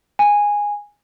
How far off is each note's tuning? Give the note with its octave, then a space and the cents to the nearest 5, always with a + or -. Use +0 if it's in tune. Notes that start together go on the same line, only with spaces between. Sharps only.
G#5 -10